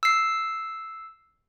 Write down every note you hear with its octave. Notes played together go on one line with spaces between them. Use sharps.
E6 C7